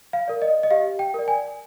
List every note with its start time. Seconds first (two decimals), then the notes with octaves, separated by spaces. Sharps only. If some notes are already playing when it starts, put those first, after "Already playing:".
0.13 F5
0.28 A#4 D5
0.42 D#5
0.63 D#5
0.71 G4 F5
0.99 G5
1.14 A#4 D5
1.28 G#5